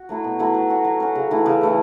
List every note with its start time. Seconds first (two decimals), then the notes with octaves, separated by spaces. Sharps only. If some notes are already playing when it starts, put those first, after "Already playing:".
Already playing: F#4
0.09 F#3 A3 E4
0.24 B2
0.39 F#3 A3 E4
0.54 F#3
0.70 C#4 F#4
0.85 F#3
1.00 C#4 F#4
1.15 C#3
1.31 E3 A3 E4
1.46 C#3
1.61 E3 A3 E4